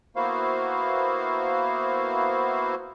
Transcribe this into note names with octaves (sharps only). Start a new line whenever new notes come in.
A#3 B3 E4 F#4 C5 F5